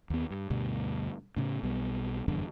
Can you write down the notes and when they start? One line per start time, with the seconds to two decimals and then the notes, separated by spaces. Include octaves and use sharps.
0.10 D#2 B3
0.31 G2
0.50 D2 G2 B2
1.37 A2 C#3
1.63 B1 B2 G3
2.28 F1 E2 G2 D3